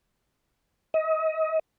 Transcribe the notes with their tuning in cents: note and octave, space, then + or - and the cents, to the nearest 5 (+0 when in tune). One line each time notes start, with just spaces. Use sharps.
D#5 +35